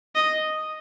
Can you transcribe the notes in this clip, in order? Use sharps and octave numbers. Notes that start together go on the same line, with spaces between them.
D#5